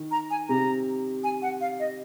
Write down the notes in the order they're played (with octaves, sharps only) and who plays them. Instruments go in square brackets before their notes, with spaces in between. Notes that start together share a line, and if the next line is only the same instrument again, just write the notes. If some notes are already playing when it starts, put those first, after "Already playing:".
Already playing: [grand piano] D#3
[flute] A#5
G#5
[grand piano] C3 [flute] A#5
[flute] G#5
F#5
F5
D#5